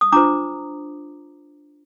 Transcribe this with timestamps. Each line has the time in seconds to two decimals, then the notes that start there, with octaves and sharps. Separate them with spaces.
0.01 D#6
0.12 D4 F4 C5 A#5 D6